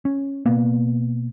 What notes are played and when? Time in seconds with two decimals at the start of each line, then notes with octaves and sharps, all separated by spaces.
0.05 C#4
0.46 B2 A#3 B3